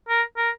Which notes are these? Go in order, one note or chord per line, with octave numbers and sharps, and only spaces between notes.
A#4
A#4